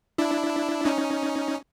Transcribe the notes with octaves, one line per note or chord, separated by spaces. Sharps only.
D4 E4
C#4 D#4